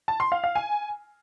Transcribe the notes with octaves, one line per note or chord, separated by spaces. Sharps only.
A5
C6
F5
F5
G#5